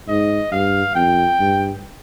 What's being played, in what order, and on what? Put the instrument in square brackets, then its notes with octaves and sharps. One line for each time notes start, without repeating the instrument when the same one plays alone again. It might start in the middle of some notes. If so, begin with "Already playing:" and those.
[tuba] G#2 [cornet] D#5
[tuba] G2 [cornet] F5
[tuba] F2 [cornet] G5
[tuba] G2